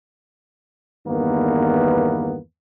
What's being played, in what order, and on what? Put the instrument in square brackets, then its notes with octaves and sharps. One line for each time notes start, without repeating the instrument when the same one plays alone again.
[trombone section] E2 G2 D#3 A#3 B3 B4